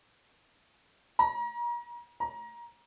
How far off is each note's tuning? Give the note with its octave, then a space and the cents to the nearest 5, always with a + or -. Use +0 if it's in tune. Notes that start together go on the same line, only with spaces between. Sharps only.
A#5 +35
A#5 +25